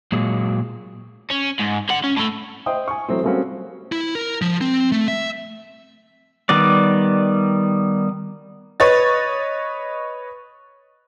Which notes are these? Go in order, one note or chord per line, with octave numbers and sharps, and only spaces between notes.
A#2 F#3 G#3 A#3
C#4
G#2
D3 F#5
C#4
A2 A3
C5 D#5 E5 G5 D#6
G#5 C#6
E3 F#3 A3 C4
G3 A3 A#3 C4 C#4 F#4
E4
A#4
F3
C4
A3
E5
D#3 G3 B3 D5
B4 C#5 D#5 A6